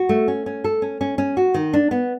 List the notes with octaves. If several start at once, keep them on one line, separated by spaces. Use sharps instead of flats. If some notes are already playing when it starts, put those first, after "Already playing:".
Already playing: F#4
A3
C#4
C#4
A4
C#4
C#4
C#4
F#4
D#3
D4
B3